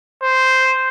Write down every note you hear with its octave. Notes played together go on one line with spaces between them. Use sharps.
C5